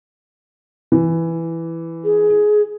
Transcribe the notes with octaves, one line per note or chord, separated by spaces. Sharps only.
E3
G#4